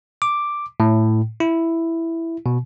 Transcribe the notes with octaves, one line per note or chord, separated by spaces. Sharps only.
D6
A2
E4
B2